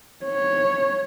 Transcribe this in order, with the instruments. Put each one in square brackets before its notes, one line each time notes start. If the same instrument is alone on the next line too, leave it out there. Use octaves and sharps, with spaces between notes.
[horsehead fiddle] C#5